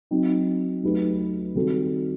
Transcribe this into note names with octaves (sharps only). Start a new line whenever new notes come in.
F#3 C4 D#4
F#3 A3 D#4 G4 B4
D#3 G3 C4 F#4 A4